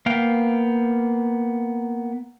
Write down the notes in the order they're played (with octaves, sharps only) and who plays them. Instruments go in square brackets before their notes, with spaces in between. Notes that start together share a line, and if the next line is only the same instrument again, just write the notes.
[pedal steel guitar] A#3 B3 F5 G5